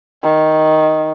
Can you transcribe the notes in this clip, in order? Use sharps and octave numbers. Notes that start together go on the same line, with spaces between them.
D#3